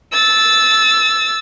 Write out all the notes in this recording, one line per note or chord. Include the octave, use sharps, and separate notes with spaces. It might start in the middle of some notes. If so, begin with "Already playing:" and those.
E6 A6